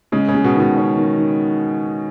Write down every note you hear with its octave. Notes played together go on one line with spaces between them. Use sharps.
C#3 G#3
C#3
G#3
B2
B2 D#3
C#4
D#3
D#3